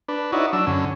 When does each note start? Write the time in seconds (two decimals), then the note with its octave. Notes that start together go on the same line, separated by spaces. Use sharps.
0.08 D4 B4
0.32 D#4 E4 F#4 C#5 D5
0.53 F#3 D4 E6
0.67 F#2 D3 C#4